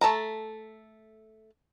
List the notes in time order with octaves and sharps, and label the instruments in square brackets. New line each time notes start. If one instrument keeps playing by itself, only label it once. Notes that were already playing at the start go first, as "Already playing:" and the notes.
[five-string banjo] A3 A4 A5 A#5